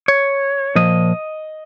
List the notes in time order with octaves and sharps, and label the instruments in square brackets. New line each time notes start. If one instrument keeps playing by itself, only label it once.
[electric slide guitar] C#5
A#2 F3 D#5